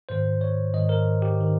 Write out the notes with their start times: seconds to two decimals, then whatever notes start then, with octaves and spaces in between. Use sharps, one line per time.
0.09 G#2 D#3 C5
0.41 C#5
0.74 G#2 D#3 D#5
0.89 A#4
1.22 G4
1.41 D#3